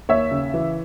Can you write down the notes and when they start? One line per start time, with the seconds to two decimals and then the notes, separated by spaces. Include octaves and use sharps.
0.09 D#2 C#5 E5
0.31 C#3
0.54 E3